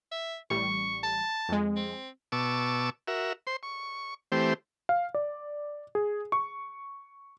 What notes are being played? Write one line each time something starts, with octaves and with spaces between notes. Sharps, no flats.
E5
A1 G3 C#6
A5
F2 G#3
C4
B2 A5 C#6 D6 E6
F#4 A#4 E5
C5 C6
C#6
E3 A3 C4 G4 C5
F5
D5
G#4
C#6